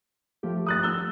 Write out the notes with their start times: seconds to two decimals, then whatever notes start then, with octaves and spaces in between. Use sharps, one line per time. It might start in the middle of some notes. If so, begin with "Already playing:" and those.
0.43 F3 A3 G4
0.66 D#6 F#6 A6
0.83 E6 G7